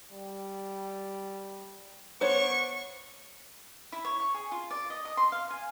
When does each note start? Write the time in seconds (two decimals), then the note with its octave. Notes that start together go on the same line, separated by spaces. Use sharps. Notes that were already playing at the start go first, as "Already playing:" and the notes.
0.12 G3
2.21 B3 D4 C5 C#5 C#6
3.92 E4
4.05 C#5
4.20 C#6
4.34 G#4
4.51 F4
4.71 D5
4.90 D#5
5.05 D#5
5.17 C6
5.32 F5
5.50 G#5